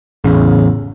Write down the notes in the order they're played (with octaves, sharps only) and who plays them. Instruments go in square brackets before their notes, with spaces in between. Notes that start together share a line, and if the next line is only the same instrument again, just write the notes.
[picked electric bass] A1 E2 [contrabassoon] C#3